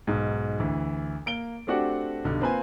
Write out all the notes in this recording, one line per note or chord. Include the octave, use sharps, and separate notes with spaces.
B1 G#2
D2 E3
A#3 D7 G7
A3 C4 D4 F#4 G4 F#5
B1 G2 D3
A#3 C4 F4 B4 C5 G#5